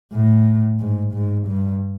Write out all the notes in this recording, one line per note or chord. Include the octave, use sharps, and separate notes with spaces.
A2
G#2
G#2
G2